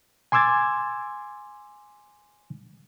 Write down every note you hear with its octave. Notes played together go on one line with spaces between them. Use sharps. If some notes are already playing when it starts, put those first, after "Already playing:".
G#5 C6 D6 E6 G#6 A6